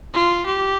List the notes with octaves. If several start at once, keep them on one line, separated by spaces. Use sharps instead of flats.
F4
G4